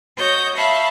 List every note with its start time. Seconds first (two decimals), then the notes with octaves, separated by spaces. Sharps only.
0.17 F#4 C#5 D#5 G6 A#6
0.55 C#5 E5 F5 A5 B5